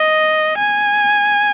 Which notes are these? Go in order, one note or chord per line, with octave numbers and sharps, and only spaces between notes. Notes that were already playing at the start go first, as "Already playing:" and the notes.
Already playing: D#5
G#5